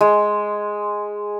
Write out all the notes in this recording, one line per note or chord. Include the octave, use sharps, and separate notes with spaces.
G#3